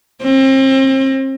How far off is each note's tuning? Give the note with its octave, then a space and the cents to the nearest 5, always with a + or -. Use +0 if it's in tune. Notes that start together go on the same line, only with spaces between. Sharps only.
C4 +35